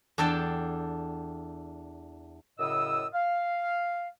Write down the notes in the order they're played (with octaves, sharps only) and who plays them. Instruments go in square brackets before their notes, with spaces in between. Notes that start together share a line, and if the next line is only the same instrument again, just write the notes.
[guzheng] E2 D4 A4 G5 A5
[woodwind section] F#2 A2 C#3 D#5 D#6 E6
F5